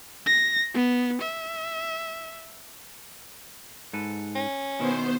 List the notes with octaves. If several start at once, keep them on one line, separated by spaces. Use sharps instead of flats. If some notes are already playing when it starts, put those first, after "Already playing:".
A#6
B3
E5
G#2 A4 B4
C#4
B2 D#3 B3 E4 C5